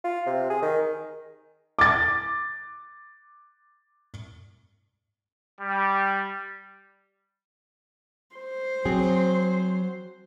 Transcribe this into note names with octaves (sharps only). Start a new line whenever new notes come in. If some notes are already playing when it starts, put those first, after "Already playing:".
F4
C3
G#4
D#3
D6 A6
G3
C5
F#3 C4 G#4